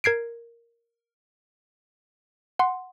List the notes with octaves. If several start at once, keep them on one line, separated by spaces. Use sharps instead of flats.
A#4 G#6 C7 D7
F#5 C6